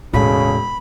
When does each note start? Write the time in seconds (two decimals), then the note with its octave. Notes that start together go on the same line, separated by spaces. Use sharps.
0.14 E1 A2 C#3 A4 B5